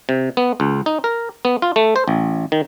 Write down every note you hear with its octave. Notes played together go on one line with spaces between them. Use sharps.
C3
B3
C#2
D#4
A#4
B3
F4
A3
C5
A1
D#3